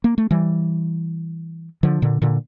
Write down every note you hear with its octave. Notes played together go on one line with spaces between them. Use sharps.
A#3
A3
E3 G3
D3 F3
A#2 D3
A#2 D3